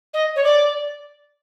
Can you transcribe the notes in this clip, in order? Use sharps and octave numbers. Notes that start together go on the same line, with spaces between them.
D#5
C#5
D5